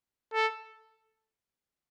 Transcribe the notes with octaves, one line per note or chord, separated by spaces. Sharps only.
A4